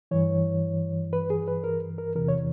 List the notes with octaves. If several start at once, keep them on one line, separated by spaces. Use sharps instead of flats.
G2 E3 C#5
B4
G#4
B4
A#4
A#4
E2 C3 E3 A#4
C#5